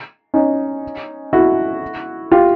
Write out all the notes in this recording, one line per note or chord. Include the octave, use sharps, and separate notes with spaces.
C#4 D#4
E4 F#4
F4 G4